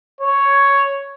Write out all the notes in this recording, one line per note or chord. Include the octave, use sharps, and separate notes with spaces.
C#5